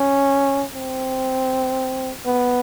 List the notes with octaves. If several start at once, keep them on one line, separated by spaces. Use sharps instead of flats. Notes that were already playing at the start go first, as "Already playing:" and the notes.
Already playing: C#4
C4
B3